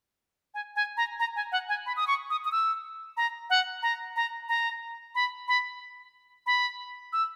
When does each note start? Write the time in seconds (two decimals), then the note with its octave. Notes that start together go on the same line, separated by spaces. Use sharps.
0.54 G#5
0.76 G#5
0.97 A#5
1.20 A#5
1.36 G#5
1.52 F#5
1.69 G#5
1.86 B5
1.96 D#6
2.07 C#6
2.30 D#6
2.45 D#6
2.52 E6
3.17 A#5
3.50 F#5
3.83 A#5
4.16 A#5
4.49 A#5
5.15 B5
5.48 B5
6.46 B5
7.13 E6